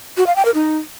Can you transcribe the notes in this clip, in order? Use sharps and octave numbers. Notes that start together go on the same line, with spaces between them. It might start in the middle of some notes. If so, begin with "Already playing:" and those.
F#4
F5
G5
A#4
D#4